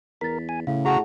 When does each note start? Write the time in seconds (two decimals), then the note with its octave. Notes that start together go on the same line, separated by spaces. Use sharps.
0.21 E2 A#4 A6 B6
0.49 G#5
0.67 A2 C#3 F5
0.85 F#4 G#4 F#5 A5 A#5